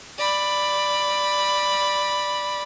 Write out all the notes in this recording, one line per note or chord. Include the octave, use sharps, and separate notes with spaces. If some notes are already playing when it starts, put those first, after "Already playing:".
D5 B5